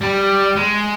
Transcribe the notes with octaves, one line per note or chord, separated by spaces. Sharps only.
G3
G#3